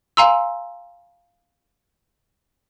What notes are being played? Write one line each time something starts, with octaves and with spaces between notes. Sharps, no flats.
F5 G#5 A#5 C6 E6